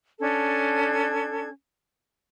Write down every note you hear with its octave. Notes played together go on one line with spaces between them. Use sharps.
C#4 D4 A4 G#6